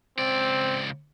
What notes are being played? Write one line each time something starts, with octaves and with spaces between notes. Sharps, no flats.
C#2 C4 D5